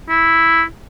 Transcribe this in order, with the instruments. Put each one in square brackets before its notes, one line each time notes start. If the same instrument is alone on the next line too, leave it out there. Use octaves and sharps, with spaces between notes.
[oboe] E4